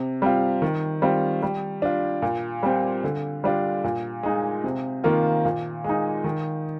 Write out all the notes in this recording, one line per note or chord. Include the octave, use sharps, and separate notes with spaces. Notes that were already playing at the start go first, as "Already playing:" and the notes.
Already playing: C3
G3 C4 F4
D#3
G3 C4 F4
G3
D4 F4
A#2
G3 C4
D3
G3 D4 F4
A#2
G#3 D#4
C3
D#3 A#3 F4
A#2
G#3 D#4
D#3